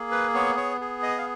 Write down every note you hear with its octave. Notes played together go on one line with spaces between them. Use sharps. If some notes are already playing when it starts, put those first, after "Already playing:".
Already playing: A#3 G#4
B4
B3 C#5
C#5
G#4
D#5
F5